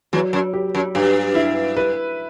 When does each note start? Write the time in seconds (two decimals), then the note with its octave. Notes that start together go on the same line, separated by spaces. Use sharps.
0.13 E2 F#3
0.33 F#2
0.53 G4
0.75 F#2
0.95 G2 G4
1.35 E4
1.77 B4